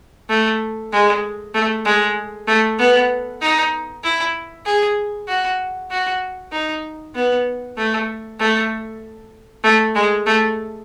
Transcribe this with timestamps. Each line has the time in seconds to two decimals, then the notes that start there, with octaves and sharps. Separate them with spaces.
0.29 A3
0.92 G#3
1.54 A3
1.86 G#3
2.48 A3
2.79 B3
3.41 D#4
4.04 E4
4.66 G#4
5.28 F#4
5.90 F#4
6.52 D#4
7.15 B3
7.77 A3
8.39 A3
9.64 A3
9.95 G#3
10.26 A3